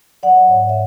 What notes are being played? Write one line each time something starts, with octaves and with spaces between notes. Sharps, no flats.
F#3 D5 F#5
G#2 C#5 E5
E5